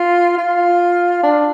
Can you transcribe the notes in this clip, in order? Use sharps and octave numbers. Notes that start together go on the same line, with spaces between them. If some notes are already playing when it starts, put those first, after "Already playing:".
Already playing: F4
F4
D4